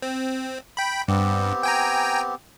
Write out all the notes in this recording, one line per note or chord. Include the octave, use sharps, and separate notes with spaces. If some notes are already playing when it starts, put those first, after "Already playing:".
C4
G5 B5
G2 B3 C4 G4
G5 G#5 A#5